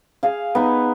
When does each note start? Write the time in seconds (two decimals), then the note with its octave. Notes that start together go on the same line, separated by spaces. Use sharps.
0.23 G#4 F5
0.55 B3 D#4